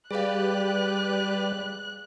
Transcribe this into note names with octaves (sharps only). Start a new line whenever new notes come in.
G3 G4 G#4 B4 D5 F5 F#6